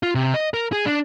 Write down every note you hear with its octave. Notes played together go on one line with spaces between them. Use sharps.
F4
C3
D#5
A#4
G#4
D4